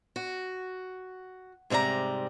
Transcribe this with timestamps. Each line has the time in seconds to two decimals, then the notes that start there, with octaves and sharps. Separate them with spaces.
0.16 F#4
1.70 G#2 C3 G3 B4 A#5